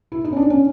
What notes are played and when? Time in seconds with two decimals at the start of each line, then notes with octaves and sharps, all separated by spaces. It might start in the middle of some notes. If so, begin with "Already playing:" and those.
0.12 E4
0.24 D#4
0.33 C#4
0.36 D4
0.50 C#4